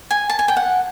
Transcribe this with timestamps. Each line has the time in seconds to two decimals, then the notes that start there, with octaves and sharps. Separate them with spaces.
0.11 G#5
0.30 A5
0.39 G#5
0.48 G5
0.56 F#5